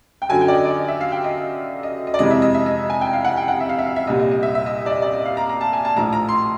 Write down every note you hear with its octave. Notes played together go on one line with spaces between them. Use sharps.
G5
F#2 D3 F#3 G#5
G5
D5
D#5
D5
E5
F5
G5
D#5
D#5
D#5
D5
F2 C3 E3 G#3 D#5
E5
D#5
E5
D#5
G#5
G5
F5
F#5
G5
F#5
E5
F5
E5
F5
E5
C2 A#2 G3 D#5
D#5
D#5
E5
E5
D#5
D5
D#5
D5
D#5
F5
A#5
A#5
A5
G#5
A5
A#1 A2 F3 A#5
A#5
C6